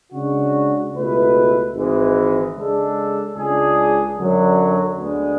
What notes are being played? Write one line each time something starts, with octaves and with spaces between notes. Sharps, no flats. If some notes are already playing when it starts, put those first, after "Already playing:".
C#3 G#3 D4 F#4
C#2 B2 A3 E4 B4
G#1 G#2 E3 G#3
C#3 G#3 D4 A4
C#2 C#3 G#3 D4 G#4
F#2 D3 F#3
D2 D3 G#3 B3